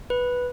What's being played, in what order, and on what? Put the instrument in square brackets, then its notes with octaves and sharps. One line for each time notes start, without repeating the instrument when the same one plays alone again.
[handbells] B4